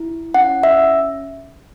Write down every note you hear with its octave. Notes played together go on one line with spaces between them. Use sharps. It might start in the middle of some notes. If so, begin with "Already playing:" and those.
Already playing: E4
C#4 F#5
E5